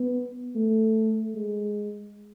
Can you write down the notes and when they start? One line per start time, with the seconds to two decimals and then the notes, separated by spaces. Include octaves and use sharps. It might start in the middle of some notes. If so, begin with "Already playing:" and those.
Already playing: B3
0.55 A3
1.35 G#3